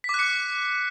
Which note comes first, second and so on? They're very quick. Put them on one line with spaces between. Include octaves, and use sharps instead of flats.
B6 D6 F#6 C#7